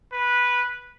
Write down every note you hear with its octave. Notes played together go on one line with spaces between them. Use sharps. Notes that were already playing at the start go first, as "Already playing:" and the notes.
B4